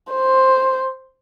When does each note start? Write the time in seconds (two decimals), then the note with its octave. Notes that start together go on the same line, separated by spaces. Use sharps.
0.13 C5